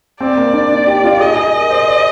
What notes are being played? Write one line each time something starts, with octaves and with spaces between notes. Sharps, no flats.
C4 D5
A#3
D4
D#4
G4
F4
G#4 D#5
G#4
A#4
C5
D5